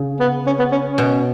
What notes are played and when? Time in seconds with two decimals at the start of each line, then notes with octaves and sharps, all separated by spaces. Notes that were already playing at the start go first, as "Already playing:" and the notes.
Already playing: C#3
0.20 B3
0.47 C#4
0.59 B3
0.72 C#4
0.86 C#4
0.98 B2